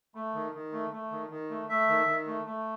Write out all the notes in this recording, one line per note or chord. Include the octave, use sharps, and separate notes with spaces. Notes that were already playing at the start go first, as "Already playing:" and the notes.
A3
D#3
D#3
A3
A3
D#3
D#3
A3
A3 E5
D#3
D#3
A3
A3